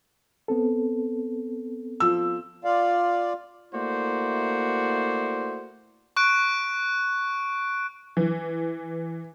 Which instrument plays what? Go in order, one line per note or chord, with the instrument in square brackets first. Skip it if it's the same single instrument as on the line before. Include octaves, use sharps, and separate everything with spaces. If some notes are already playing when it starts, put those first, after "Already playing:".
[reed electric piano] B3 C4 A4
[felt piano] F3 E6
[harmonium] F4 D5 F5
[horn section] A3 A#3 E4 F#4 C5 D5
[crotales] C#6 F#6 D7
[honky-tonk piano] E3